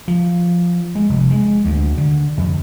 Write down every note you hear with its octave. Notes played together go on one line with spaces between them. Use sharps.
F3
G#3
F1
G#3
D2
D3
F2